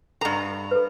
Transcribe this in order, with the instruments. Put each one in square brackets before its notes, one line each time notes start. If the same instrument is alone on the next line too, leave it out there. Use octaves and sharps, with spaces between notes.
[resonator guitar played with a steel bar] G2 A#5 [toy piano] A4 F#5
[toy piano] A4 B4